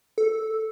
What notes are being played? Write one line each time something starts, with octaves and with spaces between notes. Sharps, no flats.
A4